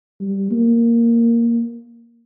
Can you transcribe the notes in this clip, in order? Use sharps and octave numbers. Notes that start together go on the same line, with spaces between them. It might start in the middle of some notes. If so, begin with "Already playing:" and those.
G3
A#3